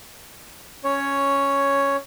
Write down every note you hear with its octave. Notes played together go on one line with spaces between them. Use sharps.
C#4 C#5